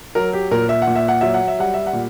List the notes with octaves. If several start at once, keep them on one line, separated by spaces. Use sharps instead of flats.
F#3 A#4
G4
A#2 A#4
E5
F#5
A#2
E5
F#5
F#3 E5
F#5
E5
G3 F#5
E5
F#5
A#2